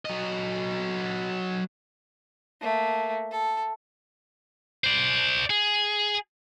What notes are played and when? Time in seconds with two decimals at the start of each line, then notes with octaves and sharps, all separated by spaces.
0.05 F#3 D#5
2.61 A3 A#3
3.32 A4
4.84 C5 D5
5.50 G#4